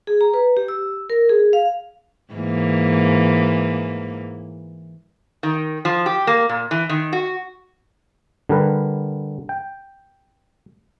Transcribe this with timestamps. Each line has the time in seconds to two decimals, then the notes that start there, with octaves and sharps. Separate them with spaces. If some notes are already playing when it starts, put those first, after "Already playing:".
0.07 G#4
0.21 A#5
0.34 B4
0.57 G4
0.68 E6
1.10 A#4
1.29 G#4
1.53 F5
2.33 G#2 E3 A#3
5.43 D#3
5.85 F3
6.06 G4
6.27 A#3
6.49 A#2
6.71 E3
6.89 D#3
7.13 F#4
8.49 D3 G3 A#4 B4
9.49 G5